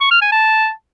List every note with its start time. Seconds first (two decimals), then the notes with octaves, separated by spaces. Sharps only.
0.01 C#6
0.11 F6
0.22 G#5
0.32 A5